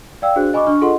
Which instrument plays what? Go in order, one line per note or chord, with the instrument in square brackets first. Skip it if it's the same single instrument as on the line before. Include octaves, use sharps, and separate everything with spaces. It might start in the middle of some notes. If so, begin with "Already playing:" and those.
[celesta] D5 F5 G5 E6
D4 F#4 G#4 C5 F#6
D#5 G#5 B5 C#6 D6
D4 C#6 F6
F4 G#4 A4 D#5 F#5 C6